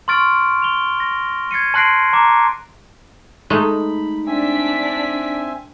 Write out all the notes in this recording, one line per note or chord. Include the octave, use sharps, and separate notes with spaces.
C6 C#6 F6 A6 D7
F7 G7
A#6
G#6 A6 C7 C#7 D#7
A5 C6 F#6 A#6 C7 D7
A#5 D6
G#3 A3 D#4 B5
C4 D4 E5 G#5 B6